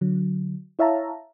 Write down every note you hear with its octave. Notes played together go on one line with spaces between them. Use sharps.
D3 F#3
E4 C#5 E5 F5 A5 A#5